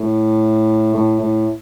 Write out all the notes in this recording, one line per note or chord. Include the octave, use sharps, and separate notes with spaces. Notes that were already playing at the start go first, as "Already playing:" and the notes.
Already playing: A2
A2
A2